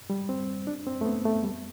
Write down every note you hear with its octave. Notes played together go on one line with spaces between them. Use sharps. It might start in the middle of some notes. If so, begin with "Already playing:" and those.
G3
C4
D4
C4
A3
B3
A3
G3